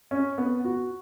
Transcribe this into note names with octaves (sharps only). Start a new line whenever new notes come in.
C#4
B3
F#4